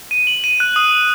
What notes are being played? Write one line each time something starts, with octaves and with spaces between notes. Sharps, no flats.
D#7
F#7
D#7
F#6
D#6